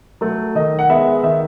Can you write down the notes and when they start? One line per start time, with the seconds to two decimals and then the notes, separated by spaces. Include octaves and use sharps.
0.21 F#3 A3
0.55 D#3 D#5
0.79 F#5
0.90 G#3 B3 E5
1.23 D#3 E5